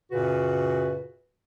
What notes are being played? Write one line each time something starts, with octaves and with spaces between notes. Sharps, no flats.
F#2 A#2 C#3 F#4 B4